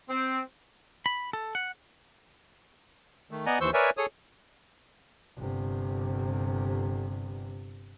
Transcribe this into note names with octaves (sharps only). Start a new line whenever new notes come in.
C4
B5
A4
F#5
D#3 A3
B3 D5 D#5 F#5 G#5 A#5
D#2 E3 C5 C#6 E6 G6
A#4 B4 C#5 D5 E5 G#5
G#4 A4 C#5 D#6
G1 C3